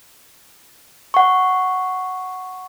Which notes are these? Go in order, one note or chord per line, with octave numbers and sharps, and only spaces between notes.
F#5 C#6